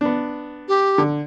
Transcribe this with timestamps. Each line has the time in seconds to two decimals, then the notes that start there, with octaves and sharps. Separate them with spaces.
0.01 B3 D4
0.68 G4
0.98 D3